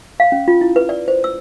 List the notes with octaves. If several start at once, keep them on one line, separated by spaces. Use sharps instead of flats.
F5
C#4
F4
E4
B4
D5
C5
E6